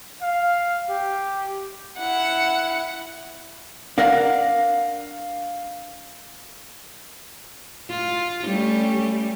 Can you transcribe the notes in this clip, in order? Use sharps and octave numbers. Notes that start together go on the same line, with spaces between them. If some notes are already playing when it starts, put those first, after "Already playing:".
F5
G4
E4 F#5
D4 A#4 F5 F#5
F4
G3 A3 C#4